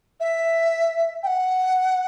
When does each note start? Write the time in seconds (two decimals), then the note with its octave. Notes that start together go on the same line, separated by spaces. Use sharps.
0.20 E5
1.23 G5
1.27 F#5